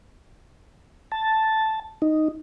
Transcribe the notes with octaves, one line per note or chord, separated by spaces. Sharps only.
A5
D#4